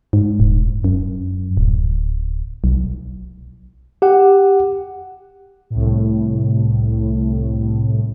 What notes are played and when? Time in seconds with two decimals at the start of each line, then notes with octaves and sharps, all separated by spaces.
0.13 G#2
0.40 D#1
0.84 F#2
1.57 D1
2.64 B1
4.02 G4 F#5
5.70 C2 A2